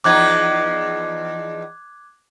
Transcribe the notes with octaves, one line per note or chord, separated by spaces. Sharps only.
E2 F3 D#4 D6 F#6 G#6